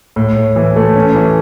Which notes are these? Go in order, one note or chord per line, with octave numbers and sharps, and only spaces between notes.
A2
A2
E3
A3
C#4
E3